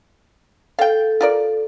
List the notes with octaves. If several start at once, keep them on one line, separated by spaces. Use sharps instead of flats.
A4 F5 G5
F4 A#4 D5